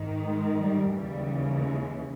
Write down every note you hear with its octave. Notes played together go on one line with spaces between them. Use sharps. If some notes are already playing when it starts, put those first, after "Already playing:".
Already playing: G#2 D#3
G#3
G3
D#2 C#3 E3 G3
G#3